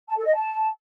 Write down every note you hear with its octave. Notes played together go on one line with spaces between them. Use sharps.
A5
A4
D#5
A5